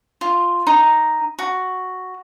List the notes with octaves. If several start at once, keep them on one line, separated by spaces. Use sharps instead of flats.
F4
D#4
F#4